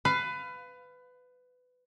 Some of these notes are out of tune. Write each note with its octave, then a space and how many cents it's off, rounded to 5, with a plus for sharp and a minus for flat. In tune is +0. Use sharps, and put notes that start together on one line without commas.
B4 +20 F5 +0